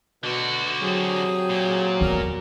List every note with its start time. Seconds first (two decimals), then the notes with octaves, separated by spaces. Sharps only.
0.23 B2 D3 F#4
0.82 F#3 C4 G4 G#4
1.49 A#2
2.01 E2 G2 A#4